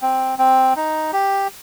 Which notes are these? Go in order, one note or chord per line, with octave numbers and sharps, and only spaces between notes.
C4
C4
D#4
G4